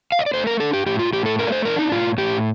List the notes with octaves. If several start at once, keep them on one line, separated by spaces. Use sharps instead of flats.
F5
D#5
D5
A3 C5
A#4
D4 A4
G4
A2 G4
F4
A2 G4
A4
A3 A#4
D5
C5
D4 A#4
D#4
A2 F4
A2 G4